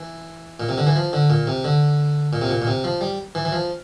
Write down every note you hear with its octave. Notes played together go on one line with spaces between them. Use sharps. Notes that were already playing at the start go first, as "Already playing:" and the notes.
Already playing: E3
A#2
C3
D3
E3
F3
D3
A#2
C3
D3
A#2
C3
A#2
A#2
C3
F3
G3
E3
E3
F3